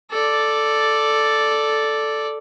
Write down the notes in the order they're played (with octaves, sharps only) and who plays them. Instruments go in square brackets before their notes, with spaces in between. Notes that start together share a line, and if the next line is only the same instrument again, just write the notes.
[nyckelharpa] A4 D5